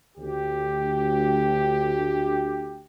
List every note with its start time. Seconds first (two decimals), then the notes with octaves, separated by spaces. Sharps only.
0.18 D2 G4